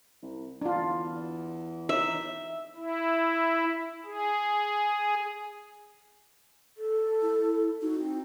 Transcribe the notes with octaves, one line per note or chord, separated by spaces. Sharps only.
C2
E2 D4 F4
D#4 E5
E4
G#4
A4
E4
D#4 F#4
C4